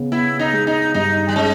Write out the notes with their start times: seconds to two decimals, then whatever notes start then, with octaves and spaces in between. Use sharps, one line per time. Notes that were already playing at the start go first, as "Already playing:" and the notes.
Already playing: C#3 B3
0.12 B3 E4
0.39 D#4
0.53 G#3
0.67 D#4
0.94 G2 D#4
1.29 G3
1.36 G#3 C#4